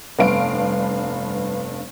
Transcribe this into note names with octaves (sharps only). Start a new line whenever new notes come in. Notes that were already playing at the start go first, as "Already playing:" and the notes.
F1 G2 B3 F5 D7